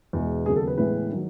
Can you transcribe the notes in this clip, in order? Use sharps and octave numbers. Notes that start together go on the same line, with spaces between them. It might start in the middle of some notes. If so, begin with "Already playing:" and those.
E2 B2 G#3
D#2 C#3 F#3 B3 G#4
A4
B4
A2 E3 G#3 B3 B4
D#3 F#3